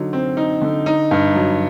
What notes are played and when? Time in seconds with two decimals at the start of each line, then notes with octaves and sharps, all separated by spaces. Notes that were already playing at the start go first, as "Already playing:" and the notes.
Already playing: D3 F#3 D#4
0.13 C4
0.37 D#4
0.61 D3
0.86 D#4
1.11 G2
1.35 F#3